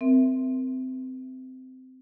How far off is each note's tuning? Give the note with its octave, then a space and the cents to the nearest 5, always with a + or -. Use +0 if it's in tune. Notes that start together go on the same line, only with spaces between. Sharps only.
C4 -20 A#4 +0 E5 +0